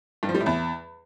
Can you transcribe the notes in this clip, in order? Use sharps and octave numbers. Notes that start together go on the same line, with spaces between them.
G2
F3
G3
A2
E2